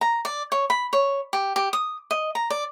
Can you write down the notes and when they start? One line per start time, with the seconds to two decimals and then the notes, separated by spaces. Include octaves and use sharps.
0.01 A#5
0.25 D5
0.52 C#5
0.70 B5
0.93 C#5
1.33 G4
1.56 G4
1.73 D#6
2.11 D#5
2.35 A#5
2.50 D5